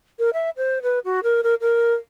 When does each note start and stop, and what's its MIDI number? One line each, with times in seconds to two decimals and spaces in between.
0.19 0.30 70
0.33 0.50 76
0.57 0.82 72
0.82 0.99 71
1.05 1.20 66
1.23 1.41 70
1.43 1.55 70
1.61 1.94 70